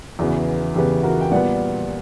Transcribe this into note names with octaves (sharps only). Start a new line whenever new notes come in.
E2 C#3 E3 B3 F#4
E2 C#3 E3 B3 G4
F#4 A#4
G5
A#2 G3 B3 D5 F#5